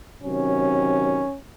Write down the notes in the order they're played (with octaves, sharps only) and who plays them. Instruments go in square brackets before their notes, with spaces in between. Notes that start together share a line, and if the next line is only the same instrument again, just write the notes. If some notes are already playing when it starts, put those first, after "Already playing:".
[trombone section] C3 D#3 F#3 C#4